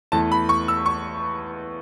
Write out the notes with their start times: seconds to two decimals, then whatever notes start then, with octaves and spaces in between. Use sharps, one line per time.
0.12 E2 E3 A3 A5
0.32 B5
0.49 C#6
0.68 E6
0.86 C#6